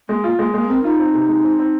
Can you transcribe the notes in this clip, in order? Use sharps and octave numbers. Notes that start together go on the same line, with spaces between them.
G#3 A#3
A#3 F4
G#3 A#3
G#3 A#3
C4 A#4
D#4 F4
C4
C3
G#3
C4
C4